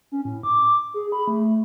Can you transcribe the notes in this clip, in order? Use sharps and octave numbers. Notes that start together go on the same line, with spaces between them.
C#4
A2
D6
G#4
B5
A3